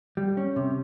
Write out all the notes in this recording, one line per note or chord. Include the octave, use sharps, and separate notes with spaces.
G3
C#4
C3